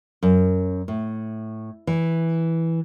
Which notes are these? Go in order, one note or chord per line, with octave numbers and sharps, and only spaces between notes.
F#2
A2
E3